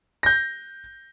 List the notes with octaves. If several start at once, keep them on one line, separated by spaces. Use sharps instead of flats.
G6 A#6